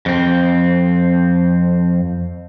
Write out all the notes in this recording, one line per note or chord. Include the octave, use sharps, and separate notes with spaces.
F2 C4